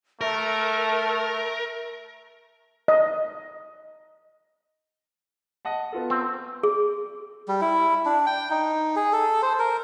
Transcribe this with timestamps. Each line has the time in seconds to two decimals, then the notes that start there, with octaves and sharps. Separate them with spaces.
0.21 A3 A#4 E5
2.88 D#5
5.65 D#5 F#5 A5
5.92 B3 F4 A4
6.10 C4
6.63 G#4
7.48 G3
7.61 E4
8.05 D4
8.26 G5
8.51 D#4
8.96 G#4
9.13 A4
9.42 C5
9.59 A#4